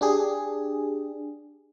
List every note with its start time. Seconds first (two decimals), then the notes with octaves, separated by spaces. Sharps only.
0.01 D4 G4 G#4